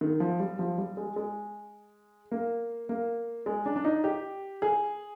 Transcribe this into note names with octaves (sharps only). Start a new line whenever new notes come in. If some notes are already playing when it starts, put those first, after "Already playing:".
D#3
F3
G3
F3
G3
G#3
G#3
A#3
A#3
G#3
D4
D4
D#4
G4
G#4